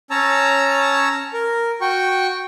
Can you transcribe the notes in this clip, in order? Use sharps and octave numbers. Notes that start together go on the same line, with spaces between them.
C#4 C#5 A5 A#5 E6
A#4
F#4 G5 C#6